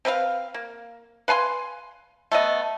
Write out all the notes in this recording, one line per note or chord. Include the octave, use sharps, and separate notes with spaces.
C4 B4 E5 F5
A#3
B4 F5 G#5 C6
A3 B3 D#5